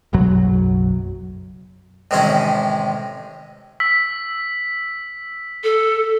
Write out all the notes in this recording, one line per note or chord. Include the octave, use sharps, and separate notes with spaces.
F#1 B1 F#2 F#3
A1 C3 D#3 G#3 C#4 G#4
E6 B6
A4